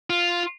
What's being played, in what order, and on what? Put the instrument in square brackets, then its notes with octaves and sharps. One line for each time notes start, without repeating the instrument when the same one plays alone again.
[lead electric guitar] F4